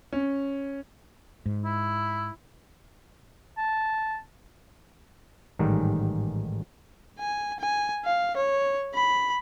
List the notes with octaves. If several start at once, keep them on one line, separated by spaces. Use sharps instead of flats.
C#4
G#2
E4
A5
A1 G#2 D#3 G3
G#5
G#5
F5
C#5
B5